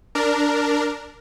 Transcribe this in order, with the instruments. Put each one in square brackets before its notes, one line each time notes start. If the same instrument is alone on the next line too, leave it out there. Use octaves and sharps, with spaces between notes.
[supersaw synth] D4 A#4